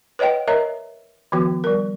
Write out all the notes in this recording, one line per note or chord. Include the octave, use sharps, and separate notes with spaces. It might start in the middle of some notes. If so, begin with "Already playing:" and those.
B4 C#5 D#5 F#5 G5
A#4 C#5 D#5 E5 A#5
D#3 F3 B3 F#4
G3 A#4